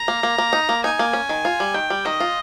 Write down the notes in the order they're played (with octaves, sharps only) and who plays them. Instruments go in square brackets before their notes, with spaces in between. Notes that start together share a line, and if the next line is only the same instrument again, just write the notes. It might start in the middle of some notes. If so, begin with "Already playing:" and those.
Already playing: [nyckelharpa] A#5
[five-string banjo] A#3
A#3
A#3
D#4
A#3
[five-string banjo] D#4 [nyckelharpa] G#5
[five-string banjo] A#3
C#4
D#3
F4
G3
[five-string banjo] D#3 [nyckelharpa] G5
[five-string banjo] G3
[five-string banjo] D#3 [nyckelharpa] D#5
[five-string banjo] F4